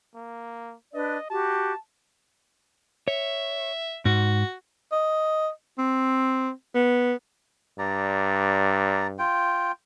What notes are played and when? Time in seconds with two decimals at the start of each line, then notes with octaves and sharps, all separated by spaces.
0.15 A#3
0.94 D4 B4 D5 D#5
1.30 F#4 G4 A5
3.08 C#5 E5
4.05 G#2 F#4
4.92 D#5
5.78 C4
6.75 B3
7.79 G2 D5 A#5
9.19 F4 G5